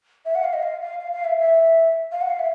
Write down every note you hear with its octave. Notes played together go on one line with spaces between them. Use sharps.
E5
F#5
F5
D#5
F5
F5
F5
F5
E5
E5
F5
F#5
F5
E5